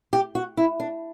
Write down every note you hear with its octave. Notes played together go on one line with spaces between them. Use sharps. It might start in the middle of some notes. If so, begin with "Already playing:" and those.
G4
F#4
E4
D4